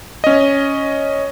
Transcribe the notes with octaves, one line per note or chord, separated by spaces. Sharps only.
C#4 D#5